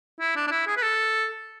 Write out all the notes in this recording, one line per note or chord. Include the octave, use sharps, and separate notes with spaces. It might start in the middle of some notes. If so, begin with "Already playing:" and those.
E4
D4
D4
E4
G#4
B4
A4